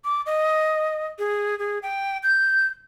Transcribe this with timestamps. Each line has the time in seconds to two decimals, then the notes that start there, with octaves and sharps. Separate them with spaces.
0.04 D6
0.26 D#5
1.19 G#4
1.59 G#4
1.83 G5
2.23 G6